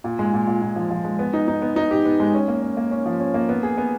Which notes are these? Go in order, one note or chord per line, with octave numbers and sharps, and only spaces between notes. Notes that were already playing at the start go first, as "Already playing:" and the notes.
A#2
G#3
A#2
A#2
A#2
F3
F3
G#3
B3
D#4
D#4
B3
D#4
G4
B3
G#3
C#4
A#3
C#4
A#3
C#4
F3
C#4
A#3
B3
G#4
B3